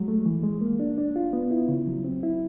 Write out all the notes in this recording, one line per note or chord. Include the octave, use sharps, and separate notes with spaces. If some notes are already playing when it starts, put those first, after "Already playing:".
Already playing: F#3 G#3
A3
E3
G#3
A#3
D4
D4
F4
B3
E4
C#3
F#3
C4
E4